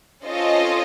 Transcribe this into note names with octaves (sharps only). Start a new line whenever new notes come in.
C#4 F4 A4 C5 D#5